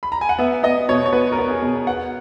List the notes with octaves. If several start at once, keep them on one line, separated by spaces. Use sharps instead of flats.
B5
A#5
G#5
F#5
B3 E5
B3 D#5
B2 C#5
C#5
B3 B4
A#4
B3
G#4
B2
B3 F#5